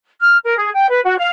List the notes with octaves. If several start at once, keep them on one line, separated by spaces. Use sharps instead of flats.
F6
A#4
G#4
G5
B4
F#4
F5